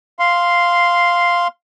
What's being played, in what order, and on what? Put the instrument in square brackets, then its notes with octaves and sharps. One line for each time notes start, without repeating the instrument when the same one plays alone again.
[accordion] F5 C6